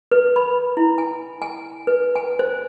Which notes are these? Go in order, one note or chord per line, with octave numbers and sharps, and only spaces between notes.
B4
B5
E4
G#5
G#5
B4
G#5
C5